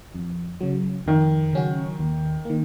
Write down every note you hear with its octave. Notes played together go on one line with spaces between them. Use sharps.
F2
C#3 F#3
F2 D#3
C#3 F#3 C#4 F#4
D#2
D#3 A#3